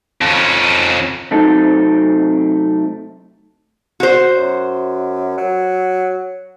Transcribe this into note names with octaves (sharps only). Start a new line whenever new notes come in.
F2 C#4
C3 F#3 A3 C4 D#4 A4
F#4 C5
F#2
F#3